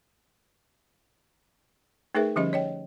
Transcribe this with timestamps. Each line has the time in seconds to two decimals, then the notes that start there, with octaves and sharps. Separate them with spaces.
2.15 A3 D#4 G#4 A#4 B4 E5
2.36 D3 F3 G3 C#4 G4 D#5
2.53 C#5 D#5 G5